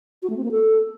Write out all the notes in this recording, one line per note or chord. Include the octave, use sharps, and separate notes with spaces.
F#4
A3
C4
A#3
A4